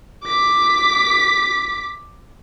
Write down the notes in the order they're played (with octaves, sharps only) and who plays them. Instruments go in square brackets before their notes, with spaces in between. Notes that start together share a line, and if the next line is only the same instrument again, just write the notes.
[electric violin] D6 B6